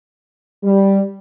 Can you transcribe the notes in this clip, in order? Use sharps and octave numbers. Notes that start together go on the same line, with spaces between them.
G3